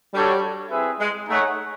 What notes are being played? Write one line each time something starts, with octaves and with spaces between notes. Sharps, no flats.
G3 D4 F#4 A4 C#5
C4 E4 G#4 B4 E5
G#3
A3 D#4 G#4 C#5 F#5